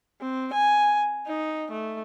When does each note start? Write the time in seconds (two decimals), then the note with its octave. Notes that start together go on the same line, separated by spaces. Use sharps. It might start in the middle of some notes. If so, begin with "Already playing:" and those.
0.21 C4
0.53 G#5
1.27 D#4
1.71 A3